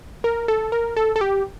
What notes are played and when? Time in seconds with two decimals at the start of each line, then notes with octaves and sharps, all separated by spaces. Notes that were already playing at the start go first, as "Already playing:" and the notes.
0.24 A#4
0.48 A4
0.72 A#4
0.97 A4
1.16 A4
1.21 G4